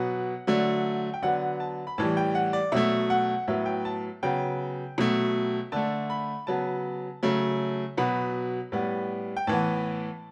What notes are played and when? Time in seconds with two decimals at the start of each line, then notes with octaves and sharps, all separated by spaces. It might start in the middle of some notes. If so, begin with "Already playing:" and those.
Already playing: B2 F#3 B3 F#5
0.47 D3 F#3 A3
1.14 G5
1.22 D3 F#3 B3 F#5
1.60 A5
1.87 B5
1.98 A2 E3 G3 A5
2.17 G5
2.35 F#5
2.53 D5
2.72 B2 F#3 A3 E5
3.10 F#5
3.48 A2 F#3 B3 E5
3.66 G5
3.85 A5
4.23 C#3 F#3 B3 G5
4.98 B2 F#3 A3
5.72 D3 A3 A5
6.10 B5
6.47 C#3 F#3 B3 A5
7.23 C#3 F#3 A3
7.97 B2 F#3 B3 B5
8.72 A2 G3 B3
9.37 G5
9.47 A2 E3 B3 A5